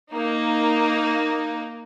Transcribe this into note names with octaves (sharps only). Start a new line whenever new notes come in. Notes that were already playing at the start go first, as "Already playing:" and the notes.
A#3 D#4